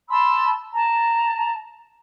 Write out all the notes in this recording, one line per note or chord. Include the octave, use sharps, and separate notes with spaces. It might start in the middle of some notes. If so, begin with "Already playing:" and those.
A5 B5 C6 E6
A5 A#5